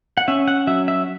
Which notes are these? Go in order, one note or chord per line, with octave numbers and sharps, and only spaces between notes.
F#5
C#4 E5
F#5
F#3 E5
E5